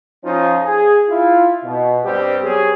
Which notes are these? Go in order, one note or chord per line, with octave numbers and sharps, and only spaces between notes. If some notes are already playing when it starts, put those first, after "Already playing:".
F3 C#4 D#4 F4
G#4
E4 F4
B2
G2 G3 C4 G4
F#3 B3 G4 G#4